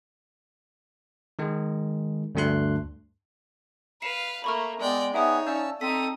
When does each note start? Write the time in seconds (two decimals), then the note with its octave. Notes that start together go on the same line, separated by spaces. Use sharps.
1.39 D#3 G#3
2.35 D2 G2 A3 D4 C6 F#6
4.02 B4 F5 C7 C#7 E7
4.44 A3 A#3 B5 C#6 F6
4.80 G#3 B3 D5 G5
5.14 B3 D#4 G#4 C#5 E5 G5 D#6
5.47 C#4 D5 F5 A5 E6 G6
5.81 C4 D#4 A4 D#6 B6